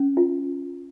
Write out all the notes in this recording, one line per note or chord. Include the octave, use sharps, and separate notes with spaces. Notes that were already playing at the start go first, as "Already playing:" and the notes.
Already playing: C#4
F4